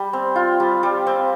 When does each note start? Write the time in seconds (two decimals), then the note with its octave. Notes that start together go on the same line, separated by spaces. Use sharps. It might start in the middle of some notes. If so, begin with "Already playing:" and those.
Already playing: G3
0.13 C4
0.35 F4
0.60 G3
0.83 G3
1.07 C4